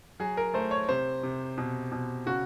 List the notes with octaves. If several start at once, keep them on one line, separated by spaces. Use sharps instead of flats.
F#3 G#4
A#4
A3 C5
C#5
C3 C5
C3
B2
B2
C#3 F#4